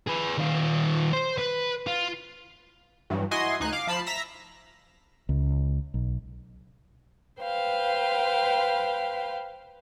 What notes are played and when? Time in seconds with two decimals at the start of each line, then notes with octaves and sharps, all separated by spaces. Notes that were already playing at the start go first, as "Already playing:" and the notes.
0.07 G#4 B4
0.38 D#3 F4
1.13 C5
1.38 B4
1.87 F4
3.10 G2 E3 F#3
3.31 E4 F#4 D#5 G#5 C6
3.60 D2 D#4 G#5 F#6
3.73 F5 D6
3.87 F3 A5 B5 C7
4.06 E5 A#5 E6 A#6 B6
5.29 C#2
5.94 B1
7.41 B4 C5 F5 G5